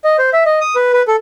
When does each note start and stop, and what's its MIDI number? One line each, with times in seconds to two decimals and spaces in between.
0.04 0.16 75
0.18 0.30 72
0.33 0.44 76
0.46 0.59 75
0.61 0.76 87
0.76 0.92 71
0.93 1.02 71
1.08 1.16 69